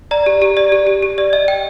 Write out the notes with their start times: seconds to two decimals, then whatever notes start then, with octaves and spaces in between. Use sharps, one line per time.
0.11 D5 A#5
0.26 G4
0.42 G4
0.57 D5
0.72 G4
0.87 G4
1.02 G4
1.18 D5
1.33 D#5
1.48 G5